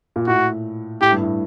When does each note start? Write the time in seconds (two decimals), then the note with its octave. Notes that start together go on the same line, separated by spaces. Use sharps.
0.16 A#2
0.27 A2 F#4
1.01 A2 G4
1.11 G2
1.22 A2